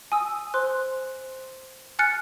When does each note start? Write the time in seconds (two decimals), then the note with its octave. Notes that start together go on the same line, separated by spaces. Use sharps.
0.12 G#5 D#6 E6
0.54 C5 C6 F#6
1.99 G#5 F6 F#6 A6 C#7